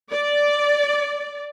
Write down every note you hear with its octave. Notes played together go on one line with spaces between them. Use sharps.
D5